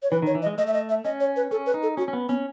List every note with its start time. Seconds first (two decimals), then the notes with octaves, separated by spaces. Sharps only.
0.03 C#5
0.11 E3 B4
0.22 D#3 C#5
0.35 E3
0.42 D#5
0.46 G#3
0.58 A3 D#5
0.67 E5
0.74 D#5
0.89 E5
1.04 C#4 D#5
1.20 C#5
1.36 B4
1.51 C#4 A4
1.66 B4
1.74 D#4
1.83 A4
1.97 C#4 F#4
2.08 C#4
2.13 B3
2.29 B3 C#4